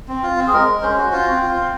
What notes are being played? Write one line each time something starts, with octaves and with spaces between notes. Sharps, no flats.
C4
F4
C4
G#4
G#3 A#4
G#3
C#4 C5
F#4
F4 C5
C4
F4
C4